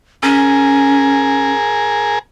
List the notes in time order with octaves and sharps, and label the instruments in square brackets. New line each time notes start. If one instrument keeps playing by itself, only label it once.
[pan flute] C#4 [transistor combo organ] G#4 A#4